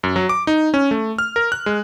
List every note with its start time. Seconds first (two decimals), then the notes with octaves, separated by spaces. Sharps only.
0.03 F#2
0.16 F#3
0.29 D6
0.47 D#4
0.74 C#4
0.91 A3
1.18 F6
1.36 A#4
1.52 F#6
1.66 G#3